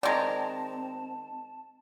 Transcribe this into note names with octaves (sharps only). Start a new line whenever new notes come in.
D#3 G#3 C4 D5 A5 A#5